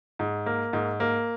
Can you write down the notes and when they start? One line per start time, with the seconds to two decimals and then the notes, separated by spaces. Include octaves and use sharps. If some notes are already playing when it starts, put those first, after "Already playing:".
0.19 G#2
0.46 A#3
0.73 G#2
1.00 A#3